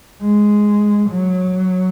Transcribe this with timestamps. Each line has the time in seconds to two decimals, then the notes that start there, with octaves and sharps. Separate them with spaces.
0.22 G#3
1.10 F#3